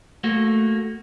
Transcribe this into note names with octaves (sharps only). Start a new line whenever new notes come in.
A3 A#3 F#4